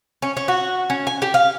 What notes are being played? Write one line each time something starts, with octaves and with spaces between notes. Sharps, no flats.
C#4
C#4
F#4
C#4
G#5
G4
F5